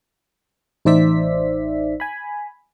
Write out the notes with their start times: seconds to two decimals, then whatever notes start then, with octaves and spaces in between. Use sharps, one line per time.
0.85 A1 D#4 C5 D5 E5 B6
2.00 G#5 B5